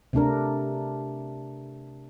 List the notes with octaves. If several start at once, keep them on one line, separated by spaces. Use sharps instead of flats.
C3 A3 D4 A#4